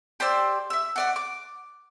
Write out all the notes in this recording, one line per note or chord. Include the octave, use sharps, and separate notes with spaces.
G4 C5 D5 E6
E5 E6
F#4 D5 F#5
D6